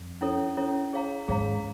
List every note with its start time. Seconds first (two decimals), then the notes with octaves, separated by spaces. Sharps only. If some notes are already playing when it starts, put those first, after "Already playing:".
Already playing: F2
0.21 C#4 E4 A4 C#5
0.57 C#4 E4 A4 C#5
0.93 G#4 C#5 F5 A#5
1.28 G#2 G#4 C#5 F5 A#5